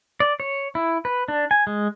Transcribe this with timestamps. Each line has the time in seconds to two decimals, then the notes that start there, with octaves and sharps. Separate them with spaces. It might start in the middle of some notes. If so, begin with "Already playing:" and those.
0.20 D5
0.40 C#5
0.75 E4
1.05 B4
1.28 D4
1.51 G#5
1.67 G#3